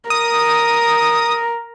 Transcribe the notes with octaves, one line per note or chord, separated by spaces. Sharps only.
A#4 D#6